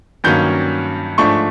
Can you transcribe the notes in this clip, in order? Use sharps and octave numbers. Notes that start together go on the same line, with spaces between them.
G2 D#3 F#3 A#3 C#4 G6
G#2 F3 A3 D4 C#6